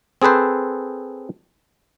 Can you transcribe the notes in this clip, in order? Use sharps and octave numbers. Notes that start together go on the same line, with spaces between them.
C4 G#4 A4 B4 C5